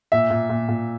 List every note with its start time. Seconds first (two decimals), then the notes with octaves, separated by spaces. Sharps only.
0.12 A#2 E5
0.30 A#2
0.49 A#2
0.69 A#2